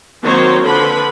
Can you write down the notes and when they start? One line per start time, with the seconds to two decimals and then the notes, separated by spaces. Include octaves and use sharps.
0.23 D#3 F#3 A#3 C4 C5 C#5
0.64 D3 F3 B4 B5